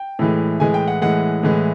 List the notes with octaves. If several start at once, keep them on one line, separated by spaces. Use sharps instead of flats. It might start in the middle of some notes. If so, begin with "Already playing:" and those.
Already playing: G5
A2 E3 G#3
A2 E3 G#3 G#5
G5
F#5
A2 E3 G#3 F#5
A2 E3 G#3